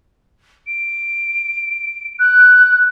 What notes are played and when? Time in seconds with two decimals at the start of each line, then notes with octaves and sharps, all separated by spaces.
0.67 D7
2.19 F#6